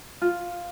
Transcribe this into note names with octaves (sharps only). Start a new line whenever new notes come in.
F4